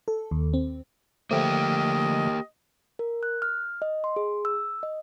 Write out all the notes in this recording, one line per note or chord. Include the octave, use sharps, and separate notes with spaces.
A4
D#2
C4
D3 F3 A3 A#3 G4 D#5
A#4
F#6
F6
D#5
C6
G#4
E6
D#5